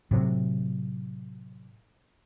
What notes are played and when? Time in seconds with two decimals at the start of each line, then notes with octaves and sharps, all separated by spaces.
0.11 A2 C3 F#3